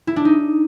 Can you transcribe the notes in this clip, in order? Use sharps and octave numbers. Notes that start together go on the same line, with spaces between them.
E4
D4
D#4